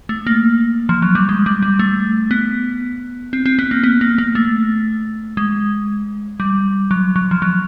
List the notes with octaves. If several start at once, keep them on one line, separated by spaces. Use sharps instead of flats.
A3
A#3
F3
F#3
G3
G#3
G3
G3
A3
B3
C4
C4
B3
A#3
B3
A#3
A#3
A3
G#3
G3
F#3
F#3
F3
F#3